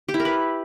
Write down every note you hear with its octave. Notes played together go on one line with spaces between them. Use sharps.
G4
E4
A#4
B4